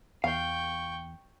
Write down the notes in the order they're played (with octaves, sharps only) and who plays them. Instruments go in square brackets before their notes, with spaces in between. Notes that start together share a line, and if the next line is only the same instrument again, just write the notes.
[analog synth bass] E2 [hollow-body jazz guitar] F5 [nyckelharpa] G5 C#6